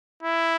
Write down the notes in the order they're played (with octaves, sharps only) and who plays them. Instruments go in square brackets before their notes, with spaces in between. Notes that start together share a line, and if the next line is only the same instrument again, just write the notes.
[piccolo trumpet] E4